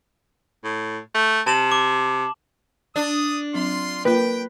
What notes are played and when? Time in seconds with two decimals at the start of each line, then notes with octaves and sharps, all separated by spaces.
0.64 A2
1.15 A3
1.47 C3 A5 E7 F#7
1.72 D6
2.96 D4 D#6
3.54 F#3 C4 F4 C6
4.05 A#3 F4 A#4 B4 G5